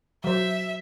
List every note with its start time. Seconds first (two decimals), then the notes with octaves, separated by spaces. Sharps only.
0.24 F#3 C5 E5